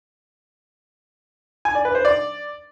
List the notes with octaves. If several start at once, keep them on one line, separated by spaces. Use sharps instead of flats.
G#5
D5
B4
C5
D5